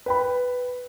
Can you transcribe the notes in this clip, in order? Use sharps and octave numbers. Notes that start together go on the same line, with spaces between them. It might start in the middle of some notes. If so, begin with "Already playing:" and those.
B4 G5 B5